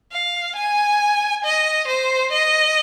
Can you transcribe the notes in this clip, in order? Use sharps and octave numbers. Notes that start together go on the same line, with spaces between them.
F5
G#5
D#5
C5
D#5